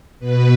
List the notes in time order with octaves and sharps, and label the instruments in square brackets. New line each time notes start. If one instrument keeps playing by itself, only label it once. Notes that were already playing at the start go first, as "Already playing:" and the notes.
[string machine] B2 B4